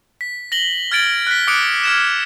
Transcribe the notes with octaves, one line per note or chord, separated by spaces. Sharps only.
B6
A#6 F#7 G7
F6 G#6 A6 D7 F#7 G7
F#6 B6
D6 D#6 F#6 C#7 D7 G7
F6 G#6 E7